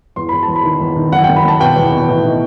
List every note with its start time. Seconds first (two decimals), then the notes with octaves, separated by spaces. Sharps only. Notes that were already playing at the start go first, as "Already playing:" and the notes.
0.16 E2 C6
0.29 E2 B5
0.43 A5
0.48 E2
0.56 B5
0.64 D#3
0.81 E2
0.96 D#3
1.12 F#1 F#5
1.24 F#1 G5
1.36 B5
1.44 F#1 A5
1.60 B2 G5
1.76 E2
1.92 B2
2.09 A2
2.24 D#4